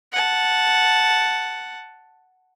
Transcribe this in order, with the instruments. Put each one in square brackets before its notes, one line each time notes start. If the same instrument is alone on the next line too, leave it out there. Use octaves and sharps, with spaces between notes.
[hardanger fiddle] F#5 A5